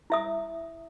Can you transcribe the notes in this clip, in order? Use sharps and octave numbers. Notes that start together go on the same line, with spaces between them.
E4 E5 D#6